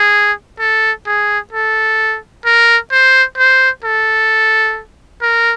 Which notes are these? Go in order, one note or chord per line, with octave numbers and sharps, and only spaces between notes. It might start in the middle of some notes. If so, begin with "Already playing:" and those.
Already playing: G#4
A4
G#4
A4
A#4
C5
C5
A4
A#4